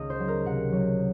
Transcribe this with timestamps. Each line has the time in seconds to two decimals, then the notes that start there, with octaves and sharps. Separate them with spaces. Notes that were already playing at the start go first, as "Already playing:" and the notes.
Already playing: C#2 D#3 D#5
0.10 C5
0.20 F#3
0.28 A#4
0.45 C3 F#5
0.72 F#3